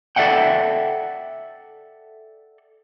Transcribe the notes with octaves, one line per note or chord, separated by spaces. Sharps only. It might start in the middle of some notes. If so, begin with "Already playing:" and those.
A4 D5 E5 F#5 G5